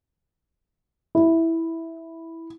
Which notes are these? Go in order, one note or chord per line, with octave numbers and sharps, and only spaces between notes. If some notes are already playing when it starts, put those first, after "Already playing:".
E4